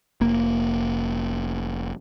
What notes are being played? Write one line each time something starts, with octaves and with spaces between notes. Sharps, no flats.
F1 A#3